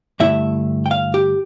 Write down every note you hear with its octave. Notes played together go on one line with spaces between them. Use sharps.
G2 D3 A3 E4 E5
G5
F5
G4